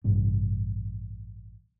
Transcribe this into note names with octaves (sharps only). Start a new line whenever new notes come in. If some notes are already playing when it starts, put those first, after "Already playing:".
A1 G2 C3